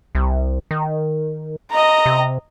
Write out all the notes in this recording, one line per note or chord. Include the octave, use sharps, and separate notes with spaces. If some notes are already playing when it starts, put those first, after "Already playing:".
C2
D#3
D#5 A#5
C3